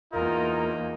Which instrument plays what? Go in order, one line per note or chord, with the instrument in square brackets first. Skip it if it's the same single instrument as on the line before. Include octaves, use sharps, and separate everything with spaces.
[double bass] E2 A#3 [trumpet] D#4 [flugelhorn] F4 [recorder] A#4